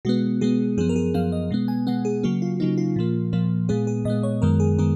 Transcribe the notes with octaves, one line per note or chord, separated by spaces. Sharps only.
B2 G#3 B3 F#4
B2 G#3 B3 G#4
F#2 F3 B3 G#4
A#4
G#4
F#2 F3 B3 F5
D#5
B2 G#3 B3
G#5
B2 G#3 B3 F#5
G#4
C#3 F#3 A#3 F#4
F4
C#3 F#3 A#3 D#4
F4
A#2 F3 A#3
A#2 F3 A#3
A#2 G#3 B3 G#4
G#4
A#2 G#3 B3 D#5
C#5
F#2 D#3 G#3 B3 A#4
G#4
D#3 G#3 B3 G#4